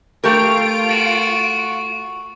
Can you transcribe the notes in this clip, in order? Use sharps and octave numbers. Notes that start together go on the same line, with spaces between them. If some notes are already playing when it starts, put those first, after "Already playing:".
A3 F4 G4 A#4 D7
F#4